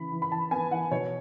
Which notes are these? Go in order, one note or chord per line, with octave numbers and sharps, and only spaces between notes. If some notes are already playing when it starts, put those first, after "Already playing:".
Already playing: C#3 E3 B5
E3
B5
E3 A5
B3 G#5
E3 F#5
B2 C#5